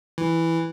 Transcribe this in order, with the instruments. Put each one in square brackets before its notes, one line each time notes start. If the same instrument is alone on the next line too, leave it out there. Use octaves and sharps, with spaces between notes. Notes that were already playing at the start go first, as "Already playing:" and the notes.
[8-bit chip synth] E3